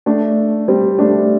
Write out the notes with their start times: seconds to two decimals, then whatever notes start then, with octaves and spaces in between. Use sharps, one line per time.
0.06 A3 D4
0.68 G3 C4
0.99 A3 D4